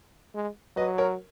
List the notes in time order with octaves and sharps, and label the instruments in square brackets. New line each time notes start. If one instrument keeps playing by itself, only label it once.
[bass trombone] G#3
[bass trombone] F#3 [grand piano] B4 D#5
[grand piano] A#4 C#5